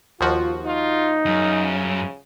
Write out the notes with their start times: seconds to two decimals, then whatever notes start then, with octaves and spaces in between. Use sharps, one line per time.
0.21 D#2 F3 F4 F#4
0.66 D#4 F4
1.25 F#2 C#3